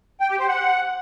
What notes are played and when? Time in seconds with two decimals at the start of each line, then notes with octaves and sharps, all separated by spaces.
0.20 G5
0.30 G4
0.39 C5
0.48 F#5